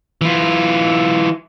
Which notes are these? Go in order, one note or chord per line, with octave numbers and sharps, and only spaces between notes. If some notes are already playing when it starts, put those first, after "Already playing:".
E3 F4